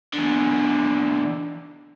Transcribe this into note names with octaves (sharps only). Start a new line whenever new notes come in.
E2 D3